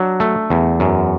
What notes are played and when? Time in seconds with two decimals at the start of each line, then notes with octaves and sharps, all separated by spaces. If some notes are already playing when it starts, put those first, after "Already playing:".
Already playing: F#3 D4
0.20 A3
0.50 E2
0.80 F#2